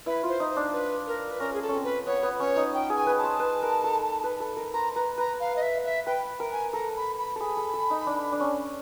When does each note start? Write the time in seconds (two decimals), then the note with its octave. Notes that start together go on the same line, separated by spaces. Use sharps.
0.06 E4 B4
0.23 F4 C5
0.40 D#4
0.51 C5
0.56 D4
0.73 B4
1.07 A#4
1.31 B4
1.40 C#4 A#4
1.53 G#4
1.62 A4
1.69 C4 C#4
1.84 B4
2.06 B3 C#5
2.23 B3
2.39 C#4 C#5
2.56 D#4
2.74 G5
2.90 G#4
2.96 G#5
3.07 B4
3.18 A5
3.24 C5
3.40 B4
3.62 A#4
3.84 A4
4.24 B4
4.40 A4
4.57 A#4
4.73 C5 A#5
4.96 B4 A#5
5.17 B4 A#5
5.40 F5
5.56 D#5
5.62 E5
5.85 E5
6.06 B4 G5
6.40 A#4
6.52 G#5
6.73 A4 A#5
6.96 B5
7.18 B5
7.36 G#4 A4 B5
7.57 A4
7.73 A4
7.90 D#4
8.07 D4
8.32 D4
8.40 C#4